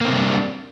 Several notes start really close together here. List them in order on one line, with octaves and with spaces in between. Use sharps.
A#3 C4 C3 G3 D4